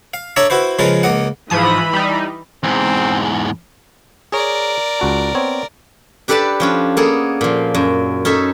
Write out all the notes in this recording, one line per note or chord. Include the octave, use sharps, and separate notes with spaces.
F5
D4 A4 C#5 E5 A5 A#5
E4 F#4 B4 C5
C#3 F3 G#3 F4 A#4 B4
C#2 A#3 D#5 F#5
G#2 E3 F3 B5 D#6
G3 D#4
E2 G#2 C4
G#4 A#4 C#5 D5
C#2 F#4 A5
B3 C4 C#5
D4 G4 A4 B4 D5 A5
F3 C#4 D4
A#3 B3 G#4 A4
A#2 F3
F#2
C#4 D#4 A4 E5